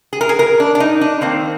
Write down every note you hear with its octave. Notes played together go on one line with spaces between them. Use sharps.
G#4
A#4
G#4
A#4
D4
D4
D#4
D4
D#3 A#3 C4